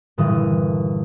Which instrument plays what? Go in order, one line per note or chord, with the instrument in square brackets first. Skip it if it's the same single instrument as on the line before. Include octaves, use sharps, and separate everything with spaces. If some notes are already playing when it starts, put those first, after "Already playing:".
[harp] G1 A#2 E3 A4 D#6